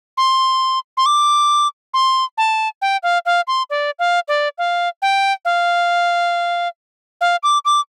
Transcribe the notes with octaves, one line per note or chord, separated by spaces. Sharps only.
C6
C6
D6
C6
A5
G5
F5
F5
C6
D5
F5
D5
F5
G5
F5
F5
D6
D6